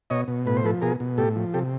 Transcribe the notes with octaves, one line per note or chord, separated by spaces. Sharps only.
B2 C#5 D#5
B2
A2 B4
C5
F3 A4 B4
B2 G#4 A#4
B2
A2 G4 A4
F3
C3 G4 A4